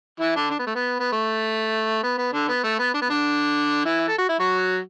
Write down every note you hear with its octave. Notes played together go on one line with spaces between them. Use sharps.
E3 E4
D3 D4
D4
B3
A3
B3
B3
A3
B3
B3
D3 D4
B3
A3
B3
D4
B3
D3 D4
E3 E4
A4
F#4
E4
F#3 F#4